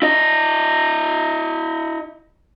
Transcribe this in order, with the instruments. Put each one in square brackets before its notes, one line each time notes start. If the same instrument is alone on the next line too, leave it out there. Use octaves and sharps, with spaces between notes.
[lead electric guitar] E4 D#5